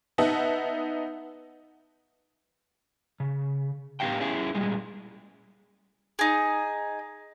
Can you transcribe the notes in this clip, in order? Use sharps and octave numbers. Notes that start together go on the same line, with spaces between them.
B3 D#4 D#5 E5 F#5 A5
C#3
A2 B3 G4 F5 G5
C#4 E4 G#4
A#2 G3 G#3
D#4 G#4